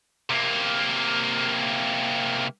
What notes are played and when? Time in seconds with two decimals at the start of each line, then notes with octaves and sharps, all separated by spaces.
0.30 C3 A#3